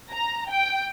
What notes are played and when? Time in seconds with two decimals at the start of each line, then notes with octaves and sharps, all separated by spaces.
0.11 A#5
0.50 G5